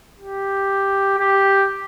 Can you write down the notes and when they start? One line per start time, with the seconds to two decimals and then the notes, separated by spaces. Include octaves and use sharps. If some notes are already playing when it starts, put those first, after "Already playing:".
0.18 G4
1.18 G4